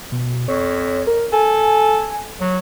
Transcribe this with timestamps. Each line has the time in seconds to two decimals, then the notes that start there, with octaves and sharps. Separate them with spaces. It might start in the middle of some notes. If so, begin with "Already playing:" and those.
0.12 B2
0.48 F2 C#5
1.07 A#4
1.32 A4 G#5
2.41 F#3